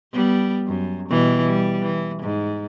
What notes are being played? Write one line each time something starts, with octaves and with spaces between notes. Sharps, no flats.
G3 B3
F#2
B2 E3 G3
G3
E3
G#2